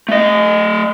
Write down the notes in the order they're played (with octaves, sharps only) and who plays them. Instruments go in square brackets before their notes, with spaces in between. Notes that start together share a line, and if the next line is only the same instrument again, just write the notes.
[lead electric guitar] A3 D#5